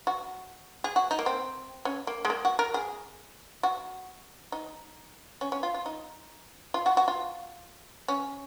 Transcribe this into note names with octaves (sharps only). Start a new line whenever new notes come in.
F#4
G#4
F#4
D#4
A#3
C4
C#4
A#3
G#3
A#3
F#4
A#4
G#4
F#4
D#4
C#4
C#4
F4
F4
D#4
F4
F#4
F#4
F4
C#4